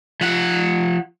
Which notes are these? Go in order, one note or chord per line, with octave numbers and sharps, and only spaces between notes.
F3 F#5